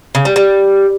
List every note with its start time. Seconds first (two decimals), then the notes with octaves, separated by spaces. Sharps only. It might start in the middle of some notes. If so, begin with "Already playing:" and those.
0.15 C#3
0.25 G3
0.36 G3